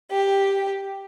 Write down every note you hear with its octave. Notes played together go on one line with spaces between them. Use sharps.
G4